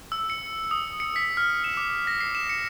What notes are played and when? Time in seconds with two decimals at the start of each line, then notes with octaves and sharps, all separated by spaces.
0.12 E6
0.30 C#7
0.71 D#6
1.00 C#7
1.16 B6
1.37 F6
1.64 E7
1.77 D6
2.07 A#6
2.21 C7
2.35 E7
2.49 C#7